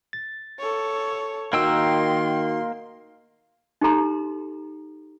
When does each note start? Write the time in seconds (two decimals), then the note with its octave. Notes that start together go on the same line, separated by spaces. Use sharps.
0.13 A6
0.60 A4 C#5
1.53 D#3 A#3 D#4 F#4 G5 C6 E6
3.81 D#4 G4 A4 A#5 C6